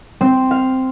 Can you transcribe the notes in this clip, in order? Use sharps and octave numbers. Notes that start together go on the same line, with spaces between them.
C4
F5